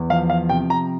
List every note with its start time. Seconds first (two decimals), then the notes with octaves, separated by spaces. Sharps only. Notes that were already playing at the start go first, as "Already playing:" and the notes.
Already playing: E2
0.10 F3 F5
0.30 F5
0.49 C3 G5
0.70 A#5